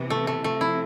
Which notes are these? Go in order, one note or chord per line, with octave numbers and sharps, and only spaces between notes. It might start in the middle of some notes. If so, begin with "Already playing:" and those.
Already playing: C3 E3 B3
A3
A3
C3 F3 A3 C4
E4